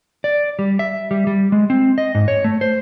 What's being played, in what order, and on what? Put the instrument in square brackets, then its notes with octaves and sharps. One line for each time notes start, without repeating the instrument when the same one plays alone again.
[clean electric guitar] D5
G3
E5
G3
G3
G#3
C4
D#5
G#2
C#5
A3
C5